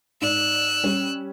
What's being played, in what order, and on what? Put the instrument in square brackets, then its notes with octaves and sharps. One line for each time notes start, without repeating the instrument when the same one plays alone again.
[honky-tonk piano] G#2 D5 [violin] E6 F#6
[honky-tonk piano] G3 C#4